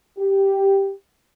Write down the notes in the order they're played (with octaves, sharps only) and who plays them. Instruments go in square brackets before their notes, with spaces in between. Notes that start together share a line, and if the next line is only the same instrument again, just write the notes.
[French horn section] G4